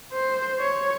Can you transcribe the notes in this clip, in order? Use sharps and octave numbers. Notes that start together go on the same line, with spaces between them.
C5
C#5